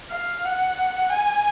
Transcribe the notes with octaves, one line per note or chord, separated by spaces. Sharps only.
F5
F#5
G#5